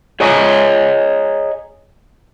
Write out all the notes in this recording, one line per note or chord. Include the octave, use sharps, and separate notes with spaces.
G#4 C#5 D#5 G#5 A#5